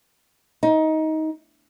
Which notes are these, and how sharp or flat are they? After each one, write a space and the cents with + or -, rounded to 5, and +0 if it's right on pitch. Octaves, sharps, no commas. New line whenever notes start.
D#4 +20